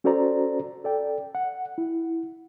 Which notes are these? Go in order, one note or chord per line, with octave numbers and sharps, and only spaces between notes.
C#4 F#4 A4 C5 D5 A#5
A4 D5 G5
F#5
E4